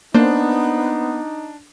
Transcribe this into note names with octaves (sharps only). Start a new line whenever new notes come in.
A#3 B3 D4 D#4 C5